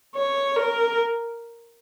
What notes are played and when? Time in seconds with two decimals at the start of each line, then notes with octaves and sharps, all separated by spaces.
0.16 C#5
0.56 A#4